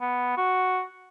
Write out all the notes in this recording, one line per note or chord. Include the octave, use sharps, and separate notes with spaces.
B3
F#4